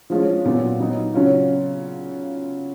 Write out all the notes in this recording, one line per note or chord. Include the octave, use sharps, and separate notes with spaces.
F3 G#3 C#4 F4
A#2 F#3 B3 F4
F#3 B3 D#4
C#3 F#3 C#4 F4